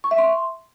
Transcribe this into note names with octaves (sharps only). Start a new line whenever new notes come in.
C#6
E5
C6